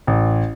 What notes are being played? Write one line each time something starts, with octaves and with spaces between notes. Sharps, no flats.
A1